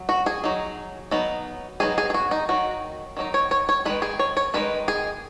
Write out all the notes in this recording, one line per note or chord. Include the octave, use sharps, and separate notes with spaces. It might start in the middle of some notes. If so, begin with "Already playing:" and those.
Already playing: F#3
F#4
G#4
F#3 D#4
F#3 B3 D#4
F#3 B3 D#4 G#4
G#4
G#4
F#4
D#4
D#3 F#3 D#4 F#4
D#3 F#3 D#4
C#5
C#5
C#5
D#3 G#3 D#4 B4
G#4
C#5
C#5
D#3 G#3 D#4 B4
G#4